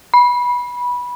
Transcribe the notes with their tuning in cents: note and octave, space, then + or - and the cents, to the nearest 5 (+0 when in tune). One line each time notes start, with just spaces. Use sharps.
B5 -15